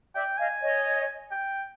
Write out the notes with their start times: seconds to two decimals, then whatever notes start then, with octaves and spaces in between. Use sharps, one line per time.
0.14 D5 E5 G5
0.38 D#5 F5 G#5
0.61 C#5 D#5
1.32 G5